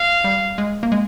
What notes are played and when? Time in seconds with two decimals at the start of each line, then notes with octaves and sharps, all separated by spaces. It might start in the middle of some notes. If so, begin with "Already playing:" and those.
Already playing: F5
0.24 G3
0.58 G#3
0.83 A#3
0.92 G#3